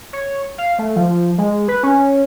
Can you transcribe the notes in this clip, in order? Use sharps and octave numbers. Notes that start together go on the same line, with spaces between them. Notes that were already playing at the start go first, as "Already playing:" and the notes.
C#5
F5
A3
F3
G#3
B4
C#4